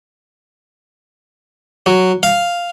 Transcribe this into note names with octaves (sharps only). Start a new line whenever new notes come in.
F#3
F5